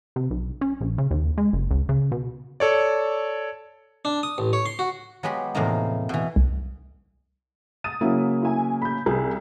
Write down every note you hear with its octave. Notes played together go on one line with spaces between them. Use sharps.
C3
B1
C#4
A#1
C#3
D#2
G#3
F#1
C#2
C#3
B2
A4 C#5 D5
D4
D#6
A1
C#5
C6
F#4
F#3 G#3 B3 G4 B5
E2 A2 C3 F3 A#3 D#4
B2 E3
C2
D#6 A6 D#7
C#3 F#3 A#3 E4
E4 G#5
B5 G6
C2 G#4